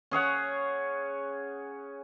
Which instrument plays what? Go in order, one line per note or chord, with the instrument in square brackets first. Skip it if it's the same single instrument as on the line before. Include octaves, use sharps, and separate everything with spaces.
[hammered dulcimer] C#4 G#4 C#5 F#5